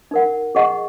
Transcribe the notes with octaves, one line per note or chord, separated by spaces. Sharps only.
D#4 A#4 F#5
G#4 D#5 F#5 C#6